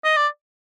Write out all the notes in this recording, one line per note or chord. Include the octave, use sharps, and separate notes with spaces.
D#5
D5